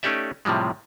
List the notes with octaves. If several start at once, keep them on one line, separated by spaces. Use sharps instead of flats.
A3 C#4 D#4 G4 D5 E5
A2 C3 F3 G3 G#3